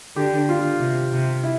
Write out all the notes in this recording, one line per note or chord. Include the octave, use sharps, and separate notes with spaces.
D3 G4
F4
C3
C3
E4